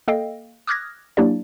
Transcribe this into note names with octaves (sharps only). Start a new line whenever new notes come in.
A#3 A4 D#5 F5 G5
D6 D#6 F6 F#6 G#6 A#6
F#3 A#3 D4 E4 G4 D5